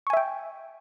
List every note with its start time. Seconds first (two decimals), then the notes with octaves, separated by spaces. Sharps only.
0.07 C#6
0.10 G#5
0.13 E5
0.17 G5